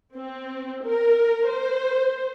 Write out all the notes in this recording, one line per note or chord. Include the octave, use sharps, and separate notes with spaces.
C4
A#4
C5